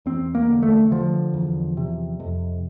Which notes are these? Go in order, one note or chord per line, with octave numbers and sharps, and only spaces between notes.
E2 C4
A#3
D3
A3
D3 F3
E2
C3
F2